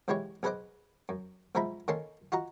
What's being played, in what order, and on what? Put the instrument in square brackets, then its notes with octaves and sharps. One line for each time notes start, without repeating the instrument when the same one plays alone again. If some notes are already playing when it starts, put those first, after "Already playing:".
[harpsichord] B1 E3 G#3 E4 G4 C#5
B1 G#4 B4 C5 D#5 D6
F#2
B1 F3 G#3 E5 A#5 B5
D#3 A#3 C#4 A4 C6
F4 F#4 D#5 A#5